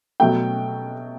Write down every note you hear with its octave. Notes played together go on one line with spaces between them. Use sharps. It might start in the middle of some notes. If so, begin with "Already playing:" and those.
B2 F#3 A3 G5